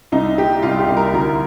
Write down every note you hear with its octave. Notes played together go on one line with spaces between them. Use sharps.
C2 D#4
A#2 G4
C2 F4
G4
C2
A#4
D2 A#4